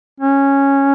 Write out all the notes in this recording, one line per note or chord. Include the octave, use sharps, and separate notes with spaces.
C#4